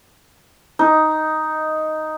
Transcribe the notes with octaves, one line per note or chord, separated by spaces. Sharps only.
D#4